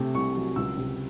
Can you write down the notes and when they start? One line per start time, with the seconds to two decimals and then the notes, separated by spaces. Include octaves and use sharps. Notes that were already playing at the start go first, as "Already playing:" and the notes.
Already playing: C3 A3
0.14 C2 C#6
0.36 F#3
0.56 C#2 E6
0.78 C3